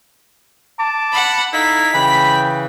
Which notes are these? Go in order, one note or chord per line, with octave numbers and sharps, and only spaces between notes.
A5 D6
F#5 B5
D#4 E4 A4 D#5 F5 B6
C#3 E3 G5 B5